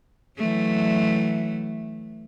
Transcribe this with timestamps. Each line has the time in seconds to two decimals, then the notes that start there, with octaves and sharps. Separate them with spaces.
0.38 E3 F#3 A3